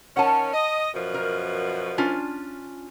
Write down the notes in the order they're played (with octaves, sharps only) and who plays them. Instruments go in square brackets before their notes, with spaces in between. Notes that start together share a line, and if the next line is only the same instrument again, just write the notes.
[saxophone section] D#3 C#4 [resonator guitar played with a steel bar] F#5 A5
[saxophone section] D#5
F#2 B2 F3
[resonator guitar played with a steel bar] A#4
C#4 D4 F4